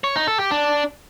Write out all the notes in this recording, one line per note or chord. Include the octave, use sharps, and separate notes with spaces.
C#5
D#4
A4
G4
D4